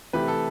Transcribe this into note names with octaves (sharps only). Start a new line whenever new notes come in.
C3 E3 A3 E4 G4 B4
A4